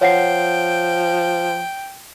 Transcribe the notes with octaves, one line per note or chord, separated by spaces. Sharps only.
F3 C#5 F#5 G5 C7